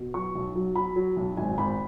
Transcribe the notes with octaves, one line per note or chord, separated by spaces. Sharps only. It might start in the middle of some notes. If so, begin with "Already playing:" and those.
Already playing: B2
F#3 C#6
B1
F#3
F#3 B5
F#3
B1
G#1 G#5
G#1 B5